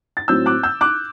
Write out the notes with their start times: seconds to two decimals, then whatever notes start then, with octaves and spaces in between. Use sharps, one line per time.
0.17 A6
0.28 A2 F#3 C4 E6 G6
0.46 D6 F#6
0.63 E6 G6
0.81 D6 F#6